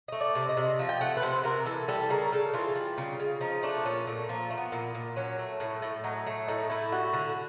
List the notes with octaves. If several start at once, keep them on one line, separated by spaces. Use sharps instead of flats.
A3 D#5
D5
C3
D#5
C3
F3
G5
A3 F#5
B4
C3 C5
C3 A#4
E3 A4
G3 A4
C#3 A#4
C#3 A4
E3 F4
G3
C#3
C#3
F3 D#4
A3 D4
A#2 C#4
A#2 A3
F3 A#3
A3
B3
A#2
A#2
F#3 C#4
A3
A2
A2
F#3 D#4
A3
A2 D#4
A2 E4
G3 F#4
D3